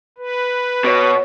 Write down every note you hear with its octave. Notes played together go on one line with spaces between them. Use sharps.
B4
B2 C#5 D6